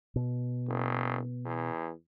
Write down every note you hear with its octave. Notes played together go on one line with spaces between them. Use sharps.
B2
F#1
E2